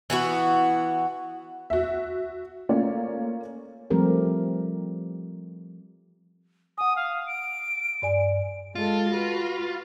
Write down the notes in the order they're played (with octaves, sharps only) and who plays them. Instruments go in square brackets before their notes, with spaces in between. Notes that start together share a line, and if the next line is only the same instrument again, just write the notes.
[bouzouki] E3 B3 F#4
[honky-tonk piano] F#4 E5
A3 A#3 C#4 F4 C#5 D5
[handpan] F3 G3 A3 C4 G4 A#4
[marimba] F#5 G#5 [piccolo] D#6
[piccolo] F5
D7
[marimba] G2 D5 G#5
[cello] G#3 A4 [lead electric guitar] F4
[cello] F#4 B4